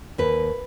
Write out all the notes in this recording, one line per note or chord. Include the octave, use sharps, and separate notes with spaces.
D#2 B4